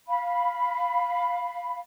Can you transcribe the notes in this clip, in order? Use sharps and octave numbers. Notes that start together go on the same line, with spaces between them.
F5 B5